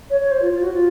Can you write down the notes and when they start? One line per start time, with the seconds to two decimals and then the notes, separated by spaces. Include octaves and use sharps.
0.10 C#5
0.21 C#5
0.31 C5
0.42 F4
0.52 F4
0.63 F#4
0.73 F4